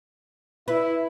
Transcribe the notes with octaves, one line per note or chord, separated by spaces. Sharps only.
E4 B4